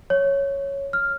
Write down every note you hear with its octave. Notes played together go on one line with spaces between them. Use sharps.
C#5
F6